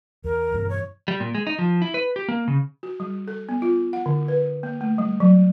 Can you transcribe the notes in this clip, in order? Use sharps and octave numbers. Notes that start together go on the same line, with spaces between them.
E2 A#4
G2 B2 E3
C#5
G3
A#2
G#3
D#4
F3
E4
B4
G4
A#3
C#3
F#4
G3
A4
B3
F4
F#5
D3
B4
A#3
A3
G3
F#3